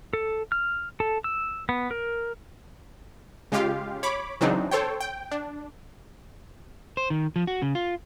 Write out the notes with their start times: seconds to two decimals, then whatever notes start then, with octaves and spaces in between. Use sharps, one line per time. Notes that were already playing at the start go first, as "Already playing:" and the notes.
0.13 A4
0.52 F6
1.00 A4
1.24 E6
1.69 B3
1.91 A#4
3.52 C#3 G#3 F4 G4 F5
4.03 C#5 B5 D6
4.41 C#3 E3 F#3 C4 D4 D#4
4.71 A4 C5 C#5 G5
5.00 G5
5.32 D4
6.97 C5
7.10 D#3
7.36 F3
7.47 F#4
7.62 C#3
7.75 F4